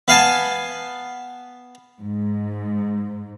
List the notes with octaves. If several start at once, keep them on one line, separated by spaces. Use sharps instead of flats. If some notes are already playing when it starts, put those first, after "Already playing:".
B3 F5 G#5 A5
G#2